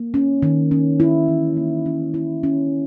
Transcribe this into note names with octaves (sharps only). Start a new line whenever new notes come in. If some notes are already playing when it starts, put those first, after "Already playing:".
Already playing: A#3
C#4
D#3
C#4
E4
E3
A#3
C#4
E4
C#4